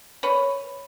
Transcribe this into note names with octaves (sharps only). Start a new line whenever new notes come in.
B4 C#5